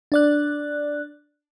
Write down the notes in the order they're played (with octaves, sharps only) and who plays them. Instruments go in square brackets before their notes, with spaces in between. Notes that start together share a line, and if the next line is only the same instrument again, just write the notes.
[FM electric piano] D4 D5 F#6